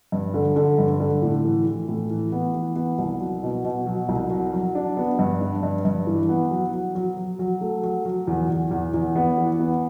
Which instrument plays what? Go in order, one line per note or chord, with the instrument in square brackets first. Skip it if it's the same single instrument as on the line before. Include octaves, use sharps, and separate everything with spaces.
[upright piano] G2
D3
D3
G2
D3
A2
E3
E3
A2
E3
B3
E3
B3
C2
F#3
B2
B2
F#3
C2
F#3
F#3
D4
B3
G2
D4
G2
G2
E3
B3
F#3
F#3
F#3
F#3
F#3
A3
F#3
F#3
E2
E2
E2
E2
B3
E3
B3